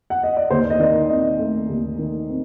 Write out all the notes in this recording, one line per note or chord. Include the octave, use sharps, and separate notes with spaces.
F#5
D#5
D5
D#2 C5
D#5
D#3 D5
C4 D#5
A3
D#2
D#3
C4